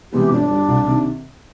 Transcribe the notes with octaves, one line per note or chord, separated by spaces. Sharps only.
C3 E3 G#3 B3 G4
G1 D4
G2 D3 G3
C2
C3 D#3